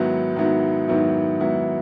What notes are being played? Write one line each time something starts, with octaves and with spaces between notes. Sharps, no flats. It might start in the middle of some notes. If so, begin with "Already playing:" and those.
Already playing: G#2 D#3 F#3 B3 E4
G#2 D#3 F#3 B3 E4
G#2 D#3 F#3 B3 E4
G#2 D#3 F#3 B3 E4